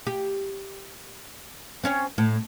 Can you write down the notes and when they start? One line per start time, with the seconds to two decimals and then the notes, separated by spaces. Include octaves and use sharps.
0.07 G4
1.84 C4 C#4 C#5
2.18 A2